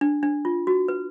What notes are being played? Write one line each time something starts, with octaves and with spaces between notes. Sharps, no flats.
D4
D4
F4
F#4
B4